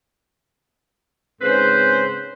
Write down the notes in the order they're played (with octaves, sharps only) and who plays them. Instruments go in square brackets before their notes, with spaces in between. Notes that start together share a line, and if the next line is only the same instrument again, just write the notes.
[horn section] G#2 C#3 C4 B4 C5